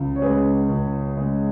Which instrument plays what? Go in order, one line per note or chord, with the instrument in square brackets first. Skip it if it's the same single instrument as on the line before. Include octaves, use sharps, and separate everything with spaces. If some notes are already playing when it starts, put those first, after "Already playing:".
Already playing: [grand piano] C#2
C#5
C#3 G#3 G#4 B4
C#2
C#3 G#3